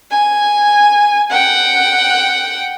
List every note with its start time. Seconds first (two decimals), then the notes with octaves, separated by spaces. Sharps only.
0.11 G#5
1.30 F#5 G5